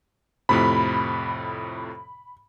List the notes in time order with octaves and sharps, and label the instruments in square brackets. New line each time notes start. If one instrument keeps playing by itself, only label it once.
[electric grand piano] F2 A2 C3 [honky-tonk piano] B5